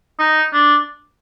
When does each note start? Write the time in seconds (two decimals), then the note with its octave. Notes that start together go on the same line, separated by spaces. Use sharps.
0.19 D#4
0.53 D4